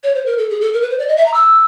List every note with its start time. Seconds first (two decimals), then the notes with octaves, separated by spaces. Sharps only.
0.03 C#5
0.15 C5
0.26 A#4
0.38 A4
0.50 G#4
0.61 A4
0.73 A#4
0.82 B4
0.90 C5
0.99 D5
1.08 D#5
1.17 E5
1.26 A#5
1.34 E6